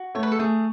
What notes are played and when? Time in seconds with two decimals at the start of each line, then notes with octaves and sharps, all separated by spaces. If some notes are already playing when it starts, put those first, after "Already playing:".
Already playing: F#4
0.15 A3 C#5
0.23 B4
0.32 A4
0.39 A3 G#4